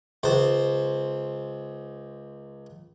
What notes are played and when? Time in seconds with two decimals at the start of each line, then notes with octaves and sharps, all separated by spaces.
0.23 C#2 C5